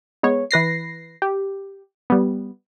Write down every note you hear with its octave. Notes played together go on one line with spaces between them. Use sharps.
G#3 B3 C#5
E3 B4 A#6 C7
G4
G3 B3